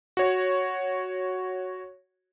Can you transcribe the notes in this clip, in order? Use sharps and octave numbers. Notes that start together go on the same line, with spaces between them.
F#4 C#5